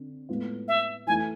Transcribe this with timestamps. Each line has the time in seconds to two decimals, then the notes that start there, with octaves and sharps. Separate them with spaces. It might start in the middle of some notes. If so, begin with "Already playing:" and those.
Already playing: D3 C4
0.29 A2 G#3 B3 F4
0.68 E5
1.07 E3 A3 E4 G#5